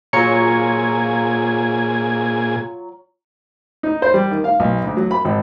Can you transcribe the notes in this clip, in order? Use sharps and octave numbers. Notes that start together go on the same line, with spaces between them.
A#2 F#3 F4 G#4 C#5 G#5 A#5 C#7
D#4
C5
G3
D#3
F5
B1
D2
F#3
B5
G#1